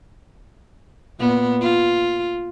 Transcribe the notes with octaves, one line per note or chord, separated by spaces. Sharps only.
A#2 B3
F4